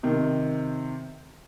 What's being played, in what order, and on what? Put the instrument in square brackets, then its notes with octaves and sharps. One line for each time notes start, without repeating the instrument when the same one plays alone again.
[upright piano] C3 D#3